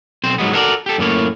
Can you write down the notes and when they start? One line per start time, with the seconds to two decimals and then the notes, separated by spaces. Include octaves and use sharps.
0.24 B1 C4 C5
0.38 G#2 F#3 G#3 B3
0.53 F#4 A4 A#4 C5 D5
0.86 G4 A4
0.98 F#2 A2 A#3 C#5